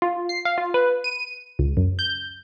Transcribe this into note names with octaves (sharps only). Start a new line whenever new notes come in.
F4
C7
F5
F4
B4
D#7
C#2
F#2
G6